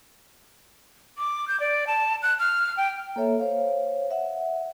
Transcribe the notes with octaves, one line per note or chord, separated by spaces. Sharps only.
D6
G6
D5
A5
F#6
F6
G5
A#3 A4 C#5 E5
C5 C#5 F5
E5 F#5